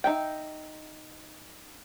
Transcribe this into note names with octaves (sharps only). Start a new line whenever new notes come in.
D#4 E5 G5